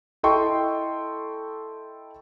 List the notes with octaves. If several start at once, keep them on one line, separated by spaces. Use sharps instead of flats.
E4 A4 D#5 G5 C6 C#6